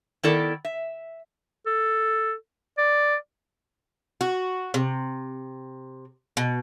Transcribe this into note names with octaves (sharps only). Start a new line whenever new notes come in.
D#3 B3 E4 A4 A#4 D5
E5
A4
D5
F#4
C3
B2